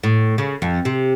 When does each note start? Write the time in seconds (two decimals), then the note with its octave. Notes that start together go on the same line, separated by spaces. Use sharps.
0.03 A2
0.38 C#3
0.62 F2
0.85 C3